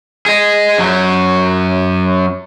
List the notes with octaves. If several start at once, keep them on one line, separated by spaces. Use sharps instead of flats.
G#4 D#5
F#2 F#3